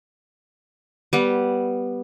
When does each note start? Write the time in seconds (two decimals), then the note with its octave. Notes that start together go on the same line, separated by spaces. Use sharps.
1.13 G3 B3